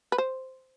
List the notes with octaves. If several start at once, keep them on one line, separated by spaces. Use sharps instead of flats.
B4
C5